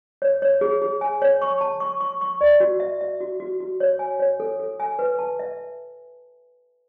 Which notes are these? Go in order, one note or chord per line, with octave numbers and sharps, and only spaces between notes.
C#5
C#5
G#4
G#4
G#5
C#5
C#6
A5
C#6
C#6
C#6
D5
F#4
E5
E5
F#4
F#4
F#4
C#5
G#5
C#5
A4
A4
G#5
B4
A5
E5